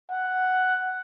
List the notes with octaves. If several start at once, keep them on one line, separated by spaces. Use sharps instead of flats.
F#5